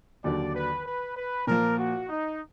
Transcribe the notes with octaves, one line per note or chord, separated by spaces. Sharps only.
D#2 D3 F#3 D4 D5
B4
B4
B4
A#2 F3 A#3 A#4
F#4
D#4